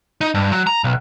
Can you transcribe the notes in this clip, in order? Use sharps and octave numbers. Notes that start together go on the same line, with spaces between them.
D#4
G2
F#3
A#5
B1